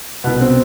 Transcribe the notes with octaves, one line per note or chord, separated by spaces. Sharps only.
C2 B2 B3
C4